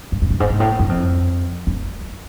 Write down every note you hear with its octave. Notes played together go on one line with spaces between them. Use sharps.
G2
F#2
G2
G#2
G#2
A2
F#2
F2
F#2